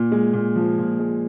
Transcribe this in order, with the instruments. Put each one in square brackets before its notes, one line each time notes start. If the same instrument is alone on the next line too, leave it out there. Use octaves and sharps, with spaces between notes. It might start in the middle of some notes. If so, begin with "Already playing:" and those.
Already playing: [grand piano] A#2
G#3
A#2
F3
A#2
G#3